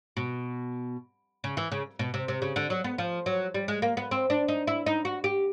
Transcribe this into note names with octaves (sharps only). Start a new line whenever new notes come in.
B2
C#3
E3
C#3
B2
C3
C3
C#3
D3
F#3
B3
F3
F#3
G3
G#3
A#3
B3
C4
D4
D#4
E4
D#4
F#4
G4